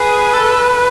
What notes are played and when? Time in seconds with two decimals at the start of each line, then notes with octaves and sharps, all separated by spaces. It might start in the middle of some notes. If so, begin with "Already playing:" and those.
Already playing: G#4 B4
0.33 A4